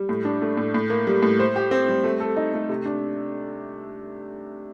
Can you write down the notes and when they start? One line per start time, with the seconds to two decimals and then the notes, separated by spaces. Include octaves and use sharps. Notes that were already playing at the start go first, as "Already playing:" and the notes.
Already playing: G3
0.09 A2
0.25 D4
0.42 A3
0.57 A2
0.74 A2
0.90 A#3
1.07 G3
1.23 A2
1.40 C5
1.56 G4
1.71 C4
1.88 G3
2.04 A3
2.20 A4
2.37 D#4
2.54 A3
2.69 C3
2.85 D4